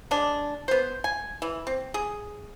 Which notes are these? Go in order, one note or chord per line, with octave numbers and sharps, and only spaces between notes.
G#3 D4
B3 C5
G#5
E3
C4
G#4